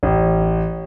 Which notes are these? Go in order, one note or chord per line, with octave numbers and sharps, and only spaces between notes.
A1